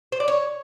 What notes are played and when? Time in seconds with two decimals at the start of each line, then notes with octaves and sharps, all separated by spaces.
0.12 C5
0.20 D5
0.28 C#5